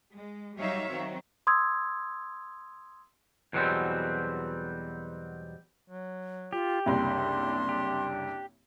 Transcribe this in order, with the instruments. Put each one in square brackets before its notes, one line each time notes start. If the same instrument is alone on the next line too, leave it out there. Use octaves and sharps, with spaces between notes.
[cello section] G#3
F#3 G3 D#4 C#5 E5 F5
D#3 F#3 C4
[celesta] C6 D#6 E6 G#6
[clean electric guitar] E2 B2 F#3 G3 C4
[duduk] F#3
[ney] F4 [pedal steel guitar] G4
[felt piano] F#1 C2 [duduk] D4 [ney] C6
[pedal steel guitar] G4